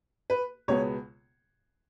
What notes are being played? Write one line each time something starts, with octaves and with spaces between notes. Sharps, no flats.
B4
C#2 B2 G#3 B3 C#5